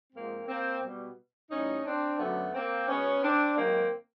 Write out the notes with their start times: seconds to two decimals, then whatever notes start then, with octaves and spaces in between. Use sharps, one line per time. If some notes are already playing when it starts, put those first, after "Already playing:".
0.13 G#2 F3 G#3 A#3 C4
0.47 A#3 C4
0.82 B2 G3
1.50 A2 E3 G3 C#4 D#4
1.85 C4 D4
2.18 F#2 D3 F#3 A3 B3
2.54 A#3 C4
2.88 B2 G#3 B3 C#4
3.22 C4 D4
3.57 G#2 D#3 F#3 A#3 C4